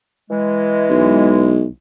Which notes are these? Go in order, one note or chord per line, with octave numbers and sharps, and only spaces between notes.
E3 G#3
B1